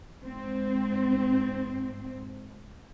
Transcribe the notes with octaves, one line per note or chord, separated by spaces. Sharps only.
G#2 C4